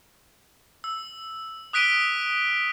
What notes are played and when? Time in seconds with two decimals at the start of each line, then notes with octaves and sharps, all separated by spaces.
0.84 E6
1.73 D#6 F#6 B6 D7 D#7 G7